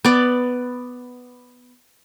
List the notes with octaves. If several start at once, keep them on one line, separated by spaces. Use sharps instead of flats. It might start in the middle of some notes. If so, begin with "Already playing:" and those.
B3 D5